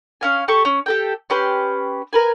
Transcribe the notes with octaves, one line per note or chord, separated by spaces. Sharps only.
C#4 F5 G#5
G4 A4 C#6
C#4
G4 A4 G5
C#4 G4 B4 C6
A#4 B4 G#5